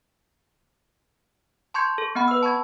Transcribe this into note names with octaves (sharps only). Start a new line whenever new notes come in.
A5 C6 C#6 G6 G#6 C#7
A4
B3 C4 F#5 B5
B4 E6
A5 B5 C#6 G#6